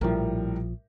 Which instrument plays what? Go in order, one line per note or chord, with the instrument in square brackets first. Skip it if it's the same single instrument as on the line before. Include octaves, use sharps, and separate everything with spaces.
[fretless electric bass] A#1 F3 [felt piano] A2 G3 A#4